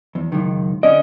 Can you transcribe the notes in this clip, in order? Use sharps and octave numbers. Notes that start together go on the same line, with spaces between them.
E2
C#2 F#2 D#3
D3 C#4 D5 D#5